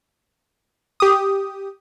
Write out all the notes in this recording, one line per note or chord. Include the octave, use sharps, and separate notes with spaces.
G4 D#6